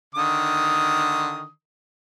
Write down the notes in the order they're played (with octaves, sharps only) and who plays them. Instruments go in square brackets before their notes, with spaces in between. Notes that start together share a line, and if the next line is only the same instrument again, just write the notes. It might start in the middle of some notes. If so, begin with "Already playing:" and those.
[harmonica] D3 D#3 D#6